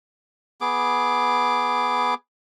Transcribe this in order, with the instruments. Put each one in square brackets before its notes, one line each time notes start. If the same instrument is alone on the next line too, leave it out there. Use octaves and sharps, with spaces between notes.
[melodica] B3 G#4 D6